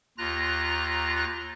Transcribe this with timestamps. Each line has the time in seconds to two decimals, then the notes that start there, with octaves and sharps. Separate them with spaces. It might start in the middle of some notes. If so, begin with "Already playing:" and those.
0.18 D#2 F4 A#5 F#6 A#6